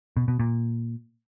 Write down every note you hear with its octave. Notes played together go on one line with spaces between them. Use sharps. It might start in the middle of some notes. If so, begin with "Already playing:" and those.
B2
B2
A#2